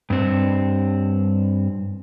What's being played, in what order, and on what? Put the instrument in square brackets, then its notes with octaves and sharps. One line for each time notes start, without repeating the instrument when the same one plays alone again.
[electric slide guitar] G2 C4